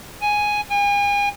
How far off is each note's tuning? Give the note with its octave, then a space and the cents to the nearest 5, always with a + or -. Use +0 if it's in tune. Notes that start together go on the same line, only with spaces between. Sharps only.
G#5 +0
G#5 -40